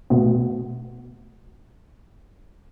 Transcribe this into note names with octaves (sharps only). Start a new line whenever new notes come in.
B2 A3 B3